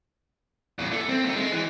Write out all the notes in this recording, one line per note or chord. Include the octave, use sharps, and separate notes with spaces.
E2 A2
A3
C4
D#3 A3
G#3
E3